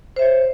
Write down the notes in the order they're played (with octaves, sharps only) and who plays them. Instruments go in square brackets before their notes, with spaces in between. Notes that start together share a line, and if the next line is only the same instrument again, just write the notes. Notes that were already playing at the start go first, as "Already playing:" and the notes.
[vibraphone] C5
E5
C#5